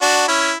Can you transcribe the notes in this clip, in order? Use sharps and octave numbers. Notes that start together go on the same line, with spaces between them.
D4 F#4
C#4 E4